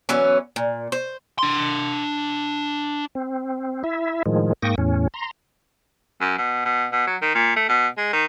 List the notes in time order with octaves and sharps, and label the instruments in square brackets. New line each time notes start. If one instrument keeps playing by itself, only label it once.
[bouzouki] E3 F#3 B3 C#4
A#2
C5
[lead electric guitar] D4 C6
[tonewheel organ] C4
E4 E5
A2 D#3 F3 G#3
G#2 A#3 G5 C#6 D#6 A#6
E2 A2 C#4
A#5 C6
[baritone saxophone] F#2
B2
B2
B2
F#3
D#3
A#2
A3
B2
G#3
D#3